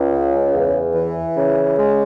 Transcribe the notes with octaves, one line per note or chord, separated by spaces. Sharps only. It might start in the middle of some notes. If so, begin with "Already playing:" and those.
Already playing: C#2
C#3
E2
E3
C#3
G#3